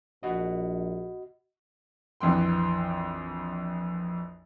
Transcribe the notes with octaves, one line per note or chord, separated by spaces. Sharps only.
A#1 F#4 D#5
A#1 F2 E3 G5 C6